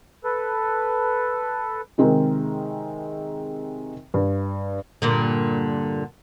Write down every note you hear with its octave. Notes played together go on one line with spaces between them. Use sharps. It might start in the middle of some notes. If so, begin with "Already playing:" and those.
A4 B4
C3 D#3 G#3 C4 A#4
G2
G2 A#2 D3